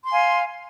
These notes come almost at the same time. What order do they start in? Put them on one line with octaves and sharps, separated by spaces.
C6 G#5 F5